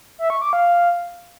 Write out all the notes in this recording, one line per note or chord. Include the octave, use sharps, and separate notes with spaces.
E5
C#6
D6
F5